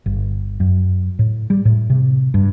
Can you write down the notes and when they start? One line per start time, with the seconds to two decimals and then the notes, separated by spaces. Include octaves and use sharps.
0.06 G1
0.60 F#2
1.19 A2
1.50 G3
1.65 A2
1.90 C3
2.34 G2